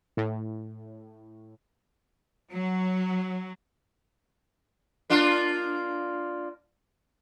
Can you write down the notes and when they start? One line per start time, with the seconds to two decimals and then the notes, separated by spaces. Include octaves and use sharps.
0.17 A2
2.51 F#3
5.10 A#3 D4 F4